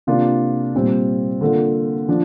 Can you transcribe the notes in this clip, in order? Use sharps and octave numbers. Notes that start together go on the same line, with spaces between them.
C3 A#3 D4 F4
A#2 G3 C4 F4
D3 A#3 F4
F3 D4